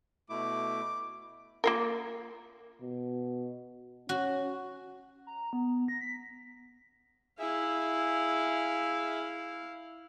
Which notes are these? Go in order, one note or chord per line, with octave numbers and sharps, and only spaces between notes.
B2 A3 E4 D6
A#3 F4 A#4
B2
C#4 F#4
A#5
B3
A#6
B6
E4 G#4 E5 F5